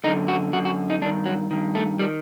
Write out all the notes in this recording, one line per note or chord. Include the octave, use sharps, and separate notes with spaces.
F#2 D3 D#4
F#4
F#2 D3 F#4
F#4
D#4
G2 D#3 D4
F#3
G2 D#3
A3
D#3 G3